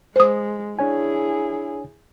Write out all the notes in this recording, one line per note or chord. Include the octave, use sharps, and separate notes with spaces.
G#3 C5 D#6
D4 E4 G#4 C#5 G#5